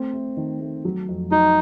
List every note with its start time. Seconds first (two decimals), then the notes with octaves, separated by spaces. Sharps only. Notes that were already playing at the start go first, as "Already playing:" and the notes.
Already playing: A3 C4
0.13 A3
0.37 D#3
0.60 A3
0.85 F#3
1.08 F2
1.32 F#3 D#4